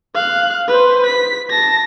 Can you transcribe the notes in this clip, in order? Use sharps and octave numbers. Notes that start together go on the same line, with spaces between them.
F5 F#6
B4 C5
B6
A5 A#6